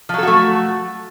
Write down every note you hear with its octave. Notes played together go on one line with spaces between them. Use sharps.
F3 F#3 A3 F#4 A4